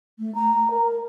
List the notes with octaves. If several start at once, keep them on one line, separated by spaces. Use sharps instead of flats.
A3
A#5
A#4